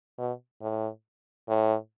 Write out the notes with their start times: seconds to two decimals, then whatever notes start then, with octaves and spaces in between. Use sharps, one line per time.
0.18 B2
0.62 A2
1.49 A2